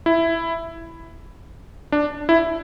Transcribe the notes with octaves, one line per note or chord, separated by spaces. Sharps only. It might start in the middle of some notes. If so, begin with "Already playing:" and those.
E4
D4
E4